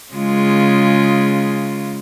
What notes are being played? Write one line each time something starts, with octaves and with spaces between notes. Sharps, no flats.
C#3 G#3 F4